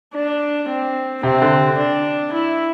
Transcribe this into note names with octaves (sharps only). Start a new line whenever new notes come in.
D4
C4
C3 C4
D3
D4
E4